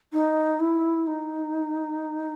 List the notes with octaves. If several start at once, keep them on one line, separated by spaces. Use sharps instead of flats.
D#4
E4
D#4